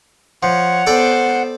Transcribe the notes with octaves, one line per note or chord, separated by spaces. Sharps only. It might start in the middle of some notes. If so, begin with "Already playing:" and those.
F3 C#5 F#5
B3 A4 C5 D5 G5